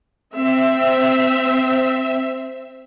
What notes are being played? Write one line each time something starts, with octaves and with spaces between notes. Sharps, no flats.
C4 E5